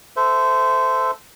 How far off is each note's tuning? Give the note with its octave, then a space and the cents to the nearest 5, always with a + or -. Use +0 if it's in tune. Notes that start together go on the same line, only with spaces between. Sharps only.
A4 +0 C5 -20 E5 +0